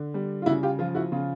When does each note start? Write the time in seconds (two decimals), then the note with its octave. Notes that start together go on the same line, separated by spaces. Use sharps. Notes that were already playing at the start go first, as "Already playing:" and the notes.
Already playing: D3
0.14 G3
0.42 F4
0.46 C#3 E4 F#4
0.63 F4 G4
0.79 F3 F4
0.95 E4 F#4
1.12 C#3 F4